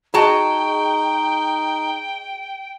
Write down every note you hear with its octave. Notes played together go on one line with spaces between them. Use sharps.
D#4 F#4 G#4 D#5 G5 A5 A#5